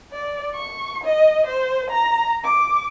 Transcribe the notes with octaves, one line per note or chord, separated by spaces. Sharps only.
D5
C#6
D#5
C5
A#5
D6